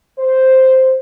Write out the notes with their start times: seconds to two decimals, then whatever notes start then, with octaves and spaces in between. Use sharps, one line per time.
0.19 C5